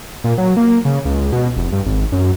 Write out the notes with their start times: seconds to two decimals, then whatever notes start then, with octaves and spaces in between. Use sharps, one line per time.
0.24 A#2
0.38 F#3
0.57 A#3
0.85 C#3
1.05 C#2
1.32 B2
1.56 F1
1.72 G2
1.86 G#1
2.12 F#2